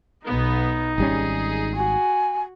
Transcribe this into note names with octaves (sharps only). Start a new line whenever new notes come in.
B1 B3 D#4
G#1 G3 C#4 G#4
F#4 G#5